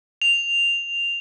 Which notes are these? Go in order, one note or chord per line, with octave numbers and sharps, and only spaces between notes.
F7